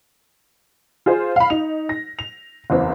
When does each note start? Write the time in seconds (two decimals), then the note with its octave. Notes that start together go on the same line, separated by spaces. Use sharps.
1.06 F4 G#4 C5
1.36 F5 B5
1.50 D#4 F7
1.89 A#6
2.19 F7
2.70 F#1 E2 C4